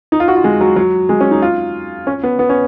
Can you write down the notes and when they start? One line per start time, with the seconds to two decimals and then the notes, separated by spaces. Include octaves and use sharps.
0.12 D#4
0.20 F4
0.28 F#4
0.36 F4
0.44 G#3
0.61 F#3
0.76 F#3
1.09 G#3
1.20 C#4
1.31 D#4
1.42 F4
2.07 C#4
2.23 B3
2.39 B3
2.50 C#4